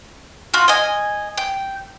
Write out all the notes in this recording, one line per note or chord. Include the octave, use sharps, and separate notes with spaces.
F4 F#4
D#5 G#5
G5